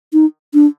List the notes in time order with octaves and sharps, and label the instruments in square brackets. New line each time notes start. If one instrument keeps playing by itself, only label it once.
[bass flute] D#4
D4